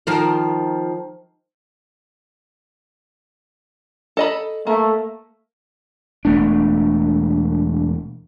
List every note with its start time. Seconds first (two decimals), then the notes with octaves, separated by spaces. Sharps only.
0.07 D#3 F3 A#4
4.17 A4 D#5 B5
4.67 A3 A#3
6.25 E1 A3 D4